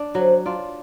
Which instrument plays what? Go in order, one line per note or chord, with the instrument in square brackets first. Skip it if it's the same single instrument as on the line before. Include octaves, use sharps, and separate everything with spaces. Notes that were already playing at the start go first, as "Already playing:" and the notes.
Already playing: [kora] D4
[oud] D3 F3 [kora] F#3
[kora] D4 F4